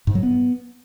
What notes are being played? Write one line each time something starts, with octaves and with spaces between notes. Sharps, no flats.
G#2
F#3
B3